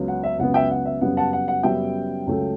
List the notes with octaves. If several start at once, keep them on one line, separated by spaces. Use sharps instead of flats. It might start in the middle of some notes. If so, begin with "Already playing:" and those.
Already playing: C#2 C#3 F#3 B3
F#5
E5
C#2 C#3 F#3 B3 F#5
E5 G5
F#5
E5
F#2 C#3 G3 B3 F#5
F#5 A5
F#5
F#5
F#2 C#3 G3 B3 E5 G5
C#2 C#3 F#3 A3